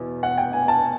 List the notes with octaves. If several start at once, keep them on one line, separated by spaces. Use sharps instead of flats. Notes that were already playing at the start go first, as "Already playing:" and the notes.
Already playing: E2 B2
F#5
G5
G#5
A5